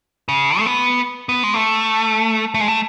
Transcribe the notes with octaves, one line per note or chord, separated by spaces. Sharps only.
C#3
A3
B3
B3
G#3
A3
A3
G#3
A3